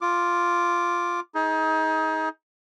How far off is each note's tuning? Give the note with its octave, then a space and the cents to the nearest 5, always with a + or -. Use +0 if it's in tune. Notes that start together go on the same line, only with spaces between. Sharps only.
F4 +0 D6 +0
D#4 +30 G#4 +20